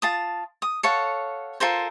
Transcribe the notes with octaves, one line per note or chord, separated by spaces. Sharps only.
F4 A5 D#6
D#6
A4 C#5 F5 F#5
F4 A4 A#4 C5